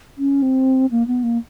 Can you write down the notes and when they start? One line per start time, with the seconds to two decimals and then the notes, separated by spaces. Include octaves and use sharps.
0.18 C#4
0.42 C4
0.91 A#3
1.07 B3
1.23 A#3